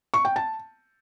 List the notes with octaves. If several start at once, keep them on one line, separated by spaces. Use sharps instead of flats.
C#6
G5
A5